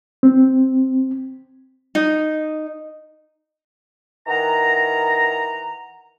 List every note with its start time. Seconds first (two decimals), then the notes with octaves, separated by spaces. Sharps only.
0.23 C4
1.95 D#4
4.27 D#3 E3 F#5 A#5